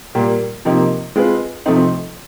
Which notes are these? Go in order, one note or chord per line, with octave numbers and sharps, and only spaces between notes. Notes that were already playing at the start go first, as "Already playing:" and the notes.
A#2 G3 A#3
C3 F3 A#3 D#4 G4
G#3 C4 F4 G#4 B4
C3 F3 A3 C4 D#4